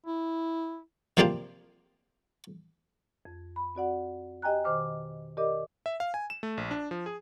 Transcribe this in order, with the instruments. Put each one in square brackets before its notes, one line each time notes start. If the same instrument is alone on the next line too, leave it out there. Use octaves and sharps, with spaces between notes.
[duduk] E4
[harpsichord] C3 F3 A#3 D4 F4 G4
[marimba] F2
B5
C4 F#4 D5 F#5
G4 D#5 G5 G#5 A#5 F#6
B2 D#3 C5 D6 F6
G4 A#4 D5 D#5 D6
[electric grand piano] E5
F5
G#5
E7
A3
A#1
D4
F3
G#4